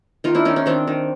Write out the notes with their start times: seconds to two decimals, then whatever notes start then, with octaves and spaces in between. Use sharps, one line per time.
0.24 D#3 D#4 F4
0.35 D4 E4
0.45 D#3 C#4 D#4
0.56 C#4
0.66 D#3 C4 D4
0.87 D#3